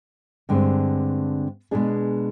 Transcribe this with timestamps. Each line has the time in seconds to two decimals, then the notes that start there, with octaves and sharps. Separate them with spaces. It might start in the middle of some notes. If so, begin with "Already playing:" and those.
0.49 G2 D3 G#3 C4
1.71 B2 G#3 B3 D4 G#4